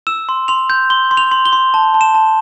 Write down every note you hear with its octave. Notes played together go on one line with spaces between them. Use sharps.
E6 E7
C6
C6 F7
G6
C6 G7
C6
F7
C6
G7
C6
A5
A5
E7
A5